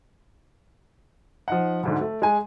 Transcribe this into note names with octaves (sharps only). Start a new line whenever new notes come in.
F3 D#4 F#5
D2 G#2 D3
A3
G#3 G#5